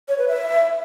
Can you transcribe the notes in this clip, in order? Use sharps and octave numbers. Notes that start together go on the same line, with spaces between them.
C#5
B4
E5